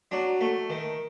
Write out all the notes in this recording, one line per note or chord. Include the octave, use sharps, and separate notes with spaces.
F#3 D4
A3
D#3